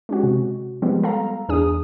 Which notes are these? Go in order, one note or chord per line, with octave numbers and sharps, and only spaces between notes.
G#3 C#4 F#4
C3
F3 G3 G#3 B3
A4 F5 A#5
E2 D4 G#4 D#6